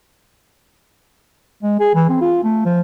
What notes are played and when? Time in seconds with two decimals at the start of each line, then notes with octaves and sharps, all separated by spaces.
1.63 G#3
1.80 G#4
1.95 E3
2.09 C4
2.21 F4
2.44 A3
2.66 F3